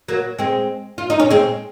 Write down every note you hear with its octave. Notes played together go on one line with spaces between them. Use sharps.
F#3 A#3
G#3 C4
F4
D#4
C#4
G#3 C4